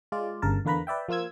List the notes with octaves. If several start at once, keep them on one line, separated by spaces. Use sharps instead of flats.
G#3 F4 D5
G1 G2 C#3 A#4 A5
E2 D3 A#3 B4 A#5 B5
B4 D5 E5 G5
F3 A#3 F4 E6 G#6